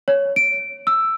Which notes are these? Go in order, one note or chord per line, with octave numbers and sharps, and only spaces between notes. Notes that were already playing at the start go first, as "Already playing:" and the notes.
C#5
D7
E6